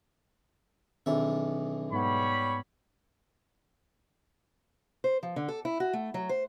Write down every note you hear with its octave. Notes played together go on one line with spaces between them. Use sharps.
B1 E2 D#3 C4 D4 E5
G#2 G3 B3 C#5 F#5 B5
C5
F3
D3
A4
E4
F#4
A3
F#3
C5